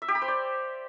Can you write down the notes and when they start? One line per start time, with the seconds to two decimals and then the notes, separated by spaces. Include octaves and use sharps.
0.02 E5
0.08 G4
0.15 B5
0.22 C5
0.28 D5